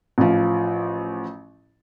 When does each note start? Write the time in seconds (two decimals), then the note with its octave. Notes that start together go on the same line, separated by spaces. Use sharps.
0.18 A1 F3